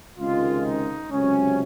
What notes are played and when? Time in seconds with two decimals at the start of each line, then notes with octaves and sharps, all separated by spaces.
0.18 C#2 C3 D#3 G#3 F4
0.64 D#4
1.11 C#2 C3 F#3 C#4